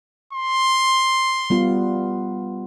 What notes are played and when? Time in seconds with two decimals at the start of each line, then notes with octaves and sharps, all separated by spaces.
0.33 C6
1.50 G3 B3 F4